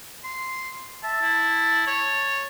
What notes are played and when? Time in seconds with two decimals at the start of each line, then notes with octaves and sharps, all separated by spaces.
0.24 C6
1.04 E5 A5
1.22 E4
1.87 C#5